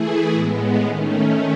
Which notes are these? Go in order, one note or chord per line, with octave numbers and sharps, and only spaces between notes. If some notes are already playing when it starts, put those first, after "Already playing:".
Already playing: E3 A3 E4 G#4
A2 G#3 B3
D#3 A3 C#4